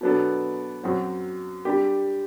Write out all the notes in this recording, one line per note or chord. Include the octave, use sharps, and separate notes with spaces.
B2 F#3 B3 D4 A4
F#2 F#3 C4 F#4
G3 D4 G4